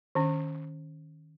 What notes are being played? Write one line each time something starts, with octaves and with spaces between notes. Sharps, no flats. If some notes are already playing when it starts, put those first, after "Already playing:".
D#3 C#4